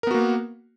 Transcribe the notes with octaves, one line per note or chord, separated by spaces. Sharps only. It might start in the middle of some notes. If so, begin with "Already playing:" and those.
A#3 B3 F#4 A#4